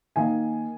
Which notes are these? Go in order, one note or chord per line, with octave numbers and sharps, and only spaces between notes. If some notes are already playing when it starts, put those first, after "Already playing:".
D#3 A#3 G#5